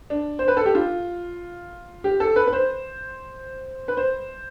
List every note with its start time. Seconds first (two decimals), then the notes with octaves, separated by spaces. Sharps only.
0.10 D4
0.39 C5
0.48 B4
0.57 A4
0.66 G4
0.75 F4
2.04 G4
2.20 A4
2.36 B4
2.47 B4
2.53 C5
3.88 B4
3.97 C5